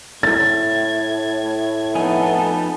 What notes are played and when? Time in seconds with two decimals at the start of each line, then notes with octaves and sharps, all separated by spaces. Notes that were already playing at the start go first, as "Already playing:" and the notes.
0.23 A2 G#6 A6
1.95 F2 B3 D#4 A4 G#5